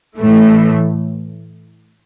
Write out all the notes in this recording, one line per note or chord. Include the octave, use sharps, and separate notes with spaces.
A2 E3 A3